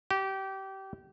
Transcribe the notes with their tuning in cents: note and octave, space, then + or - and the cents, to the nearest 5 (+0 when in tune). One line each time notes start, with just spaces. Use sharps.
G4 -25